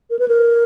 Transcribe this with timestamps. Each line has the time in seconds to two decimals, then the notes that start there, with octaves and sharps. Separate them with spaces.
0.10 A#4
0.19 B4
0.28 A#4